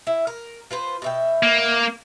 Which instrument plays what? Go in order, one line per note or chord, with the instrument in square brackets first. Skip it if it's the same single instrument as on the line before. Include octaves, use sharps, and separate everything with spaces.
[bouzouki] E4
A#4
F4 B4 C5
B2 E5 G5
[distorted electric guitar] A#3